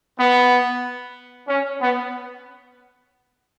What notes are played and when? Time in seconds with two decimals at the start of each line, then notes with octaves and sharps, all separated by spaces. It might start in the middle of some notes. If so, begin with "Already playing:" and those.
0.18 B3
1.48 C#4
1.81 B3